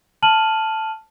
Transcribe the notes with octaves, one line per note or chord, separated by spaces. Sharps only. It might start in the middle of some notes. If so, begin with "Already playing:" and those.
A5 F6 D#7 F#7